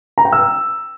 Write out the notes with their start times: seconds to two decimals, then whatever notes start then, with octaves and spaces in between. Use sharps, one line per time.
0.18 A#5
0.25 G5
0.33 E6